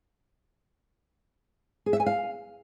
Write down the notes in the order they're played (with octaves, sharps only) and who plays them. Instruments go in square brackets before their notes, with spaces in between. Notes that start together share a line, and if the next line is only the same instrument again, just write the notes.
[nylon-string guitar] G#4
E5
G#5
F5